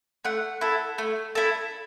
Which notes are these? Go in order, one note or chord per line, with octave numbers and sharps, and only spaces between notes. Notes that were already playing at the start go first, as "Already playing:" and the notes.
A3 F#5
E4 A4
A3
E4 A4